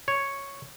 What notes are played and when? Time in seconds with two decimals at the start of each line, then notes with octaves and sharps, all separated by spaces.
0.08 C#5